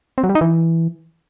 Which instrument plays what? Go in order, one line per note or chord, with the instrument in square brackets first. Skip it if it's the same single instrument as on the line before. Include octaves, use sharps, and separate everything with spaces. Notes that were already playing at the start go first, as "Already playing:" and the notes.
[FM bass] C4
F#3
G3
D#4
E3